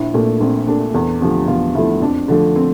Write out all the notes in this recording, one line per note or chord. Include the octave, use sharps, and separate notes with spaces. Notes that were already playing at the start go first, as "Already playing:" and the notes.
Already playing: A#1 E4
A#2 A3
A#1 C4
A#2 A3 D4
E2 A4
D3 F3 A3 G4
E2 F4
D3 F3 A3 E4
F2 D4
D3 F3 A3 D4
C4